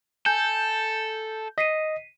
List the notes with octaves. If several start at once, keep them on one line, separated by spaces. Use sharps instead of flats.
A4 G#5 G6
D#5 B6 C7 D#7